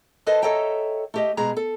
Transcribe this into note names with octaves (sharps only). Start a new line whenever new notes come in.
A4 B4 C5 D#5 A5
A4 C#5 D#5 E5 G5 A#5
A3 G4 D#5
B2 G#3 G#4 A#5
A4